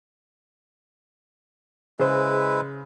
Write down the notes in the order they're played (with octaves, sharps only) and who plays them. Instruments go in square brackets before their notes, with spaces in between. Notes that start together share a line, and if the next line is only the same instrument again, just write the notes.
[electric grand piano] C#3 [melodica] G#3 E4 B4 [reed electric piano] G#4 C5